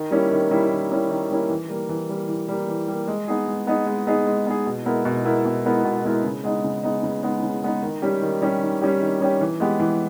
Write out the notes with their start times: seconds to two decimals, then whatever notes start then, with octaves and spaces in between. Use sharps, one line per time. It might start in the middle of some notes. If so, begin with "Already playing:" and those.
Already playing: D#3
0.11 G3 A#3 C#4 E4
0.31 D#3
0.51 G3 A#3 C#4 E4
0.70 D#3
0.91 G3 A#3 C#4 E4
1.10 D#3
1.30 G3 A#3 C#4 E4
1.49 E3
1.69 G3 A#3
1.89 E3
2.09 G3 A#3
2.29 E3
2.48 G3 A#3
2.68 E3
2.88 G3 A#3
3.08 G#3
3.28 B3 D#4 G#4
3.47 G#3
3.67 B3 D#4 G#4
3.87 G#3
4.07 B3 D#4 G#4
4.27 G#3
4.46 B3 D#4 G#4
4.66 B2
4.86 G#3 B3 E4 A#4
5.05 B2
5.25 G#3 B3 E4 A#4
5.45 B2
5.65 G#3 B3 E4 A#4
5.85 B2
6.05 G#3 B3 E4 A#4
6.24 C#3
6.44 G#3 B3 D#4
6.64 C#3
6.83 G#3 B3 D#4
7.03 C#3
7.23 G#3 B3 D#4
7.42 C#3
7.62 G#3 B3 D#4
7.82 D#3
8.02 G3 C#4 G4
8.22 D#3
8.42 G3 C#4 G4
8.62 D#3
8.81 G3 C#4 G4
9.01 D#3
9.20 G3 C#4 G4
9.41 E3
9.60 G#3 B3 G4
9.80 E3